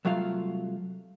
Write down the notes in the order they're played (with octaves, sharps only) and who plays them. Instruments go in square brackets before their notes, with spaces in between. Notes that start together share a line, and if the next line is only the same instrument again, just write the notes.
[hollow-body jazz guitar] C2 F#3 A3 F4 F5